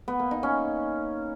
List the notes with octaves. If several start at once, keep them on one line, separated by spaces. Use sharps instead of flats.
B3
A#3
D#4
C#4